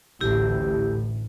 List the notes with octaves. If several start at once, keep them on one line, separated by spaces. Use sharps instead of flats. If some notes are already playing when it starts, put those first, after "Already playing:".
A1 D2 A2 E4 G4